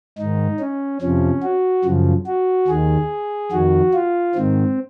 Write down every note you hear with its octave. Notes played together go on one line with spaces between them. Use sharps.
G#2 D#3 D#4
C#4
F2 C3 F3 C#4
F#4
F#2 C#3 F3
F#4
D#2 D#3 G#4
F2 D#3 F#4
F4
G#2 D#3 C4